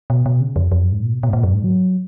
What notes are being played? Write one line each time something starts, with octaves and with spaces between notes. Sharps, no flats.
B2
B2
C#3
F2
F2
F#2
G#2
A#2
B2
B2
G#2
A#2
F#2
G#2
F#3